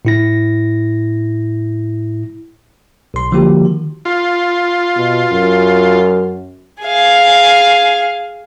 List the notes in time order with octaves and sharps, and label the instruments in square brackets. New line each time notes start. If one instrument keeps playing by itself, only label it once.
[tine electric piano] A2 E4 A#6
B1 C6
D3 F3 G3 A#3 F#4 G4
D#3
[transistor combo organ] F4
[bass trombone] B2
F#2
[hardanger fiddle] G#4 F5